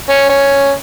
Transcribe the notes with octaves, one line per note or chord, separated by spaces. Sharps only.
C#4
C#4